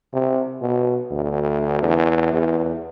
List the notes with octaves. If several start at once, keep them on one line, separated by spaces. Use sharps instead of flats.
C3
B2
D2
E2
E2